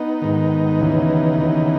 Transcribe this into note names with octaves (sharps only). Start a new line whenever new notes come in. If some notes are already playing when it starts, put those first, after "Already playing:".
Already playing: B3 D#4
G#2 D#3
D#2 C#3 E3
D#2 C#3 E3